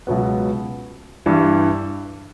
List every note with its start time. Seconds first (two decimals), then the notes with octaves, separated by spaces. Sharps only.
0.07 C#2 B2 F#3 B3
1.26 G2 E3 G3